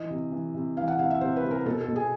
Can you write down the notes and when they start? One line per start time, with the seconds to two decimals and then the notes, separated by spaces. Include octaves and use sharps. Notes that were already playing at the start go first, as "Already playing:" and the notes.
Already playing: E3 D#5
0.10 C3
0.32 E3
0.54 C3
0.77 E3 F5
0.88 F#5
0.99 C3 F5
1.10 E5
1.21 C3 C5
1.36 B4
1.44 C3
1.51 A#4
1.66 B2 A4
1.81 A4
1.88 B2
1.96 G#4